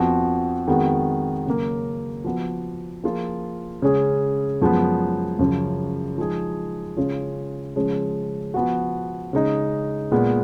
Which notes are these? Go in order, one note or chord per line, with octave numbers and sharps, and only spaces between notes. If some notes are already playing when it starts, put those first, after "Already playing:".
Already playing: F2 F3 B3 F#4
F2 D#3 G#3 B3 F#4
C#3 F#3 A#3
F3 B3 F#4
F3 A#3 F4 G#4
C#3 G#3 C#4 G#4
F#2 F3 G#3 B3
F#2 C#3 F3
F3 G#3 D#4 G#4
C#3 G#3 C#4 F4 G#4
C#3 F3 G#3 C#4
F3 B3 F#4
C#3 G#3 D#4
A#2 G#3 B3